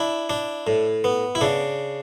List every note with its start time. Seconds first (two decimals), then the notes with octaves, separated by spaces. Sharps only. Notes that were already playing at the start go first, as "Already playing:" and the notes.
Already playing: D4 E4
0.30 D4
0.67 A2
1.04 B3
1.35 E4
1.41 C#3 D4